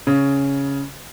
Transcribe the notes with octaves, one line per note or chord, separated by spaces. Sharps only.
C#3